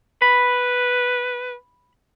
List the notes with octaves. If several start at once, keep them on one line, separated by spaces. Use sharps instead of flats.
B4 B5